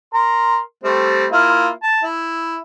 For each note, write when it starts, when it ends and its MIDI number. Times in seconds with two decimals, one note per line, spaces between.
0.14 0.58 70
0.14 0.58 84
0.84 1.27 55
0.84 1.27 57
0.84 1.27 60
1.32 1.69 58
1.32 1.69 64
1.32 1.69 65
1.83 2.02 81
2.04 2.58 64